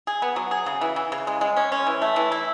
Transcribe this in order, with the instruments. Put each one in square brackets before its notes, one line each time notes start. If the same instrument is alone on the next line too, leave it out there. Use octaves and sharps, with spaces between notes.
[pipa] G#4
B3
F#3
G#4
C#3
E3
E3
C#3
G#3
G#3
C#4
C#4
E3
A3
E3
E4